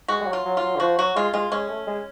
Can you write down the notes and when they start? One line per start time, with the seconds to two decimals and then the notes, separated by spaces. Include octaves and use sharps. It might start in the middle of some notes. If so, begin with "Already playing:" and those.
0.08 G#3 F#4
0.21 G#3
0.27 F#3
0.33 F4
0.45 F#3
0.57 F4
0.62 F#3
0.75 D3
0.80 F3 F#4
0.98 F#3 F#4
1.16 G#3 F4
1.34 G#3 F4
1.52 G#3 C#4
1.69 A3
1.87 G#3